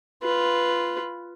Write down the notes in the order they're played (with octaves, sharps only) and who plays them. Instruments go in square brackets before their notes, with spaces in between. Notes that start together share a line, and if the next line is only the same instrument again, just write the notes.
[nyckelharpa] F4 B4